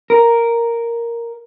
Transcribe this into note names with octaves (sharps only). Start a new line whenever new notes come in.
A#4